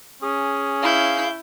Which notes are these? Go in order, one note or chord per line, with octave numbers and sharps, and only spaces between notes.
C#4 G#4
E4 F5 G6